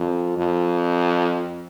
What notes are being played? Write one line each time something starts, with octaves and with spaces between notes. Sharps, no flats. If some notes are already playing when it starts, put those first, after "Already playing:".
Already playing: F2
F2